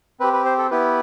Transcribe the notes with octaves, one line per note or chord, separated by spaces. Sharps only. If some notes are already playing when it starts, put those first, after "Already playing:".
C4 G4 B4
B4
C5
A4
B3 E4 G4 B4